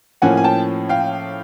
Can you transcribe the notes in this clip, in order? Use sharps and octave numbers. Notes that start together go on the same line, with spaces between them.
A2 F3 A#3 C#4 F#5 G#5
G#5
G5 A5
F5 G5